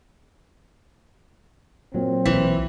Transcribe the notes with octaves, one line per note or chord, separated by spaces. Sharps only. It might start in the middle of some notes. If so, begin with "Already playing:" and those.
A#2 F#3 C4
B1 E3